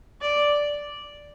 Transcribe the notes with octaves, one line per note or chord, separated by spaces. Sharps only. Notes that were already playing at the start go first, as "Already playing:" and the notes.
D5